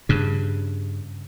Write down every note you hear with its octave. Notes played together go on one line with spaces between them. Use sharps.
G2 C#3